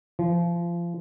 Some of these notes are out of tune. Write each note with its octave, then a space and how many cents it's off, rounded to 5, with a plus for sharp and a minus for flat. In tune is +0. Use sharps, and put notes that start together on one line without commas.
F3 -25